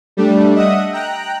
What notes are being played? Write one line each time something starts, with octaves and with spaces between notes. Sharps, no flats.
G3 A3 D4
D#5 E5 F#5 D#6
G5 A#5 F#6